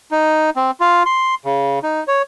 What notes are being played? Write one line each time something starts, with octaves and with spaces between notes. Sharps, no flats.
D#4
C4
F4
C6
C#3
D#4
C#5